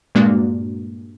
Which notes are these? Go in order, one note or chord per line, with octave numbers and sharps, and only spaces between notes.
G2 A#2 G#3 A#3 D4 F#4